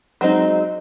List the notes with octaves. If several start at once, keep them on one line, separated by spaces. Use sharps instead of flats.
F#3 G#3 C4 D#4